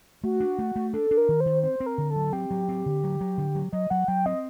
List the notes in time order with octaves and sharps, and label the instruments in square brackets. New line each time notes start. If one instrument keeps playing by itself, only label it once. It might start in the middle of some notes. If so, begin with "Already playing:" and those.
[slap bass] A3 [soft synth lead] F#4
[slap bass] D4
A3
A3
[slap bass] D4 [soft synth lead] A4
[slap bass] D4
[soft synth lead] A#4
[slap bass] D#3
[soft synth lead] C5
[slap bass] D#3
[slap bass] C4 [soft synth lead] C5
[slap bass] C4
[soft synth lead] A#4
[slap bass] D3
[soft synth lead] A4
[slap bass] F#3
[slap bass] C4 [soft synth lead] G4
[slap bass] F#3
C4
D3
F#3
F#3
D3
F#3
[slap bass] F#3 [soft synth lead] D#5
[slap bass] F#3 [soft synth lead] F#5
[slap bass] F#3 [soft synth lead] G5
[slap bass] C4 [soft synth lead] D#5